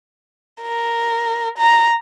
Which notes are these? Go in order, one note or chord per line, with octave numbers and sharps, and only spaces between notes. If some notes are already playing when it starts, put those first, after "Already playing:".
A#4
A#5